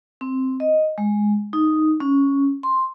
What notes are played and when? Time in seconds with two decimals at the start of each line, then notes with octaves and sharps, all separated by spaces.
0.21 C4
0.60 D#5
0.98 G#3
1.53 D#4
2.00 C#4
2.63 C6